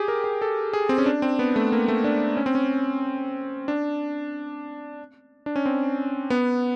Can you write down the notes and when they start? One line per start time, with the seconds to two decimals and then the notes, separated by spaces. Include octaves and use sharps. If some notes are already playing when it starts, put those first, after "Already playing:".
Already playing: G4 G#4
0.08 A#4
0.24 G#4
0.42 A4
0.73 G#4
0.89 C4
0.98 C#4
1.06 D4
1.22 C4
1.39 B3
1.56 A3
1.72 A#3
1.88 A3
2.04 D4
2.37 C#4
2.46 C4
2.55 C#4
3.68 D4
5.46 D4
5.56 C#4
5.66 C4
6.30 B3